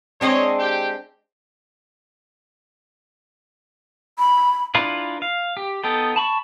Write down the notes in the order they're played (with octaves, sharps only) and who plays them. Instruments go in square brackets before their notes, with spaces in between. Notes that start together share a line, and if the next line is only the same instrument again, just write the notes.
[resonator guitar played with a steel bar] G#3 C4 D4 [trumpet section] C#5 D#5
[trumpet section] G4 G5
[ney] B5
[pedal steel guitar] D4 E4 F4 A#4 B4
F5
G4
B3 D#4 A4 G5
A5 B5 C#6